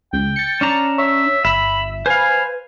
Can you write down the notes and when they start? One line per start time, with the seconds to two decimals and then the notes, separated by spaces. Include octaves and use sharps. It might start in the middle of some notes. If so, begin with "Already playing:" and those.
0.13 C#2 G5
0.36 A6 C#7
0.61 C#4 D4 A#5
0.98 C#5 E5
1.45 G1 E5 B5
2.06 B4 C5 F5 G#5